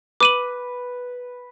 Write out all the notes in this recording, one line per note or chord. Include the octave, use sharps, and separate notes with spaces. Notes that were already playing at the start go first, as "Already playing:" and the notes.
B4 D6 D#7 F#7